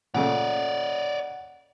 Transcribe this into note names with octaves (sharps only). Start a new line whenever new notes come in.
A#2 C#3 A3 C#5 D5 F#5